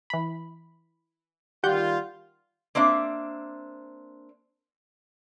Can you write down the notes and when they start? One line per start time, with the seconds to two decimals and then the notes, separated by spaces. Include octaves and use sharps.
0.10 E3 B5
1.64 D#3 G3 F4 G4 F#5 G6
2.75 A#3 C4 D4 E5